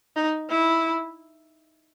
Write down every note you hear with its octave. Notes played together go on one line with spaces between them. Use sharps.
D#4
E4